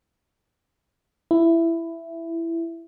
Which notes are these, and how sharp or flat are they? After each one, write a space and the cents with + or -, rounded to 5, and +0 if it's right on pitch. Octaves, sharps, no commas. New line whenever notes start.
E4 +10